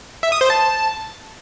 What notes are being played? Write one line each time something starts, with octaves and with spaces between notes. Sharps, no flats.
E5
D#6
C5
A5